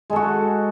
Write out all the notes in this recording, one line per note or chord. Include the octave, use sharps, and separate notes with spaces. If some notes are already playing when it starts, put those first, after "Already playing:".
G#3 F#4 A4